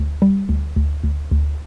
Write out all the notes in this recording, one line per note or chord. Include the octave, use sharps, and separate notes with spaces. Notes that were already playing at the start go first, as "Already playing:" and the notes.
Already playing: D2
G3
D2
D2
D2
D2